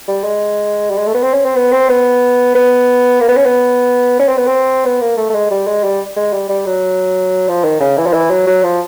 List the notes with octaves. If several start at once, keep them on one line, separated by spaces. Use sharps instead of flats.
G3
G#3
G3
G#3
A3
B3
C4
C#4
C4
B3
C4
B3
B3
A#3
B3
C#4
B3
C#4
C4
B3
C4
B3
A#3
A3
A3
G#3
G3
G#3
G3
G#3
G3
G3
F#3
F3
D#3
C#3
E3
F3
E3
F#3
F#3
F3